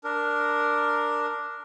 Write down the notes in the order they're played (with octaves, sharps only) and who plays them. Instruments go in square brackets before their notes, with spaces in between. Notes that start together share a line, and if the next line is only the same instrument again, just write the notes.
[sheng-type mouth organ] D4 A#4